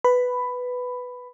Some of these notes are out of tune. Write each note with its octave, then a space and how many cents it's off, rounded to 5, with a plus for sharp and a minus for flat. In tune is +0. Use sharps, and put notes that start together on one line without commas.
B4 +5 B5 +10